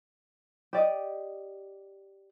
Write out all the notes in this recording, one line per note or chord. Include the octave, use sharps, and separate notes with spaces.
G4 D5 D#5